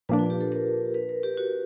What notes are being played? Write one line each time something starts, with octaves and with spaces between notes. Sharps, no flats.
A#2 F3 A#3 D4 B4
F4
G4
A4
A#4
B4
A#4
G4
F#4